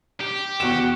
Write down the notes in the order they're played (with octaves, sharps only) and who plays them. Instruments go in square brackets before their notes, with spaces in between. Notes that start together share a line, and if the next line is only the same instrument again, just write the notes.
[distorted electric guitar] G4
[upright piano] E2 E7 [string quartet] F#4